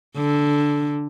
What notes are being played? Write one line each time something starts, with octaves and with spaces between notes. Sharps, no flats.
D3